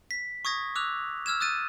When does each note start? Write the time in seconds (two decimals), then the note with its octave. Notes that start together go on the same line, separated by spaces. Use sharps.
0.11 B6
0.45 C#6 D#6 G#6 A#6
0.75 D6 E6 F#6 F7
1.26 E6 F6 G#6 E7
1.40 D#6 F#6 A6 D#7